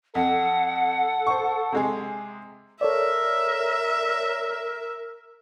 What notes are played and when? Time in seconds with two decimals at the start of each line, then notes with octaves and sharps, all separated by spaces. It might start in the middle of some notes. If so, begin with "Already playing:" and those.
0.15 F2 A4 F#5
1.27 C5 C#6
1.72 C3 G#3 G#4
2.81 A4 A#4 C#5 D5 E5